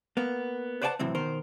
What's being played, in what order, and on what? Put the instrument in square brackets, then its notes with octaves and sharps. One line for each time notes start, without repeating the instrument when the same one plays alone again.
[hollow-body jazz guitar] A#3 B3
B4 C5 D5 F#5 G5 A5
F#2 A2 C3 E3 C4
B2 D#3 A#4 C5